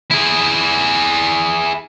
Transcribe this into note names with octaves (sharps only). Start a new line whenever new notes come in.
E4 G#4